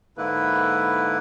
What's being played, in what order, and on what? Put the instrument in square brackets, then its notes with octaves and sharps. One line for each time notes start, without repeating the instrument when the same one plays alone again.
[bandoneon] G#2 D3 A#3 E4 B4